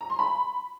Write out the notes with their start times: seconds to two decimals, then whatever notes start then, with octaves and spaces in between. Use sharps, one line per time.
0.01 A#5
0.10 C6
0.19 B5